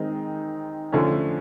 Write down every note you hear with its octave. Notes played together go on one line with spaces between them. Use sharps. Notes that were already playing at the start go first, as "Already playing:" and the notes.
Already playing: D#3 G#3 C4 D#4
D3 F3 A3 C#4